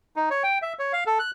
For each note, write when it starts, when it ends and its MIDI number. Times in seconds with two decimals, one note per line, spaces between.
0.16 0.29 63
0.31 0.43 73
0.43 0.58 79
0.62 0.73 76
0.79 0.93 73
0.93 1.04 77
1.07 1.19 69
1.19 1.31 90